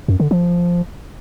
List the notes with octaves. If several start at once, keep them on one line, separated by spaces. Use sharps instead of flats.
F#2
D3
F3